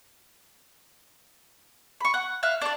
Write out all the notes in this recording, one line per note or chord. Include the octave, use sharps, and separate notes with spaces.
B5 C#6
F#5
E5 F5 F#6
D4 D5